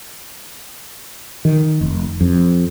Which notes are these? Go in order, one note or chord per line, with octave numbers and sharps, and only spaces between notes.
D#3
F1
F2